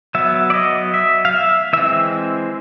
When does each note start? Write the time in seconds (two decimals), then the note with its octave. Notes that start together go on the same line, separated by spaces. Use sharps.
0.15 F#3 B3 E5
0.50 D5
0.54 D#5
0.94 E5
1.25 F5
1.34 E5
1.73 E3 G#3 C4 E5